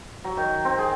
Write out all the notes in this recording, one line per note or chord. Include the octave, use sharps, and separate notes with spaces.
F#3
D#3
C4
G#4